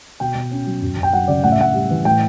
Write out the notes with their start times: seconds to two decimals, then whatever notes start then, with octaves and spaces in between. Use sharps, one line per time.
0.20 B2 G5
0.35 B2
0.51 C#4
0.66 F#3
0.82 F#2
0.97 F#2
1.03 G5
1.13 F#3 F#5
1.28 C#3 D5
1.44 A2 F#5
1.52 E5
1.59 A2 F#5
1.74 G3
1.91 E3
2.05 A2 G5